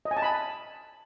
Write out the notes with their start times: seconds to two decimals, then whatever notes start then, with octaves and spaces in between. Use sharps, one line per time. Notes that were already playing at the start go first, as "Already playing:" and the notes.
0.05 D#5
0.11 G#5
0.17 A5
0.22 B5